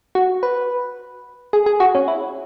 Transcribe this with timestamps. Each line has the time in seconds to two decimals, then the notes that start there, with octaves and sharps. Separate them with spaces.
0.15 F#4
0.43 B4
1.53 G#4
1.66 G#4
1.80 F#4
1.95 C#4
2.08 E4